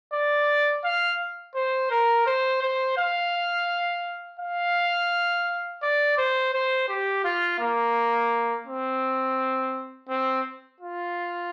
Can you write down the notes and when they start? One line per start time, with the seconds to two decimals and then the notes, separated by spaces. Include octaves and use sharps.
0.13 D5
0.84 F5
1.55 C5
1.91 A#4
2.27 C5
2.63 C5
2.98 F5
4.40 F5
5.83 D5
6.18 C5
6.54 C5
6.89 G4
7.25 F4
7.60 A#3
8.67 C4
10.09 C4
10.81 F4